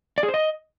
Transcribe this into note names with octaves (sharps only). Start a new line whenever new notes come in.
D5
G#4
C5
D#5